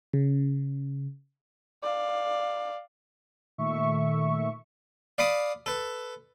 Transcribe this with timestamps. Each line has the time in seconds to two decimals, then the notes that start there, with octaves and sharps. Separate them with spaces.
0.13 C#3
1.83 D5 F5
3.58 A#2 D#3 A3 E5 C#6
5.18 D5 F5 B5 D6 D#6
5.66 A4 B4